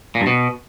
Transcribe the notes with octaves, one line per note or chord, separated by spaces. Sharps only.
A#2
G2
B2